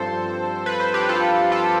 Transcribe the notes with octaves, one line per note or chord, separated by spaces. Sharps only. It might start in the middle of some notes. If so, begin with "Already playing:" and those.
Already playing: G2 F3 C4 A4 C5
B4
C5
G4 B4
B4
F4 A4
F4 A4